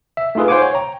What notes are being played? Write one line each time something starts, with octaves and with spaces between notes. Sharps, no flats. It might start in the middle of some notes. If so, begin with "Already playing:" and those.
E5
A3 D#4 F4 G#4 B4
C5 F5 F#5 G#5 D6
C#5
G5 A#5